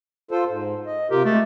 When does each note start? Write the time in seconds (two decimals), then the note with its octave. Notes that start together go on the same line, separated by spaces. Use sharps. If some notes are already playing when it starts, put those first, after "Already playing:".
0.31 F4 A4 C5
0.48 G#2
0.86 D#5
1.10 C3 F4 G4 A#4
1.25 G#3 A3